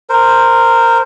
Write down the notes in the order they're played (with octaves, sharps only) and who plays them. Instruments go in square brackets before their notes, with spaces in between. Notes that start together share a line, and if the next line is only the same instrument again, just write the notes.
[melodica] A#4 C5